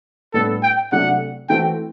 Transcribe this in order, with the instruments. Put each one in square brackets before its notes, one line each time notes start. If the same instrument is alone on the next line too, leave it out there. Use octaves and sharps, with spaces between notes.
[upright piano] A2 G3 B3 D4 [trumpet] A4
[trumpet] G5
[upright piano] C3 F#3 A3 D4 [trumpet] F#5
[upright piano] E3 A3 C4 F#4 A4 [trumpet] G5